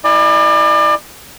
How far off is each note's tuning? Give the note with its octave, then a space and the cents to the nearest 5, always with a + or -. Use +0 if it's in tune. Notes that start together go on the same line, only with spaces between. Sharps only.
E4 -15 D5 +35 G#5 +0